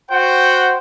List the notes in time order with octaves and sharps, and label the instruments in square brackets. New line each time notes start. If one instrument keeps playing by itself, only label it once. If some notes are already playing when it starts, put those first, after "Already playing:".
[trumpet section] F#4 C5 F#5 G5